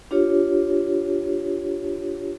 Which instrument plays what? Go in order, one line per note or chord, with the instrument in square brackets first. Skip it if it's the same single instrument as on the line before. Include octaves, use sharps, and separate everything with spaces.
[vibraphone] D4 F4 G4 C#5